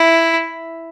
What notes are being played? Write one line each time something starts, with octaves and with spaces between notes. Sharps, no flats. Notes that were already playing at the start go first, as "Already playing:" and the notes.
Already playing: E4